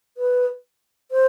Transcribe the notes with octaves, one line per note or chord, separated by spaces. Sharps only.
B4
C5